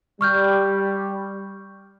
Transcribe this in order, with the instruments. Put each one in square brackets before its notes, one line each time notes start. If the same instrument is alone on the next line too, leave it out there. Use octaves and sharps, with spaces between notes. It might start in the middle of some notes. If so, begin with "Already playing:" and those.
[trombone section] G3 [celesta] C#6 F6 G6